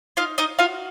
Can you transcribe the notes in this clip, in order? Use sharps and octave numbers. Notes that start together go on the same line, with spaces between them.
D#4 F4 F5
D#4 D#5
F4 F#4 F5